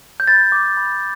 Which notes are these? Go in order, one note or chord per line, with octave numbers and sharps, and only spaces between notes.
G6
B5 A6
D6 G6
B5